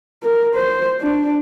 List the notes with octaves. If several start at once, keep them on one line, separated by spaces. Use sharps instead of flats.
A#4
C5
D4